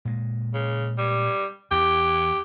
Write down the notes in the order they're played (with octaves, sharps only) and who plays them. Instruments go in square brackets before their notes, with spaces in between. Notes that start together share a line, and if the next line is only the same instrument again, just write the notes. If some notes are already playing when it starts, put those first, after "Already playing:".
[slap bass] A#2 G#3
[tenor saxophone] C#3
G3
[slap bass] E2 E3 [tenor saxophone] G4